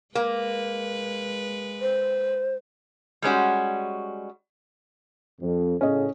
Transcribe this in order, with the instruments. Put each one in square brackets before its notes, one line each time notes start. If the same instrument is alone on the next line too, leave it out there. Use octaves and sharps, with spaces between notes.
[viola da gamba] G#3 B4 [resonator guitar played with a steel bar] A#3
[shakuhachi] C5
[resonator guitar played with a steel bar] G3 G#3 C#4 F#4
[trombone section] F2
[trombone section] A2 C#3 [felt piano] C#4 D#5